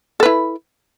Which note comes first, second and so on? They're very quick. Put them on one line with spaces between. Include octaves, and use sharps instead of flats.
A4 B4 E4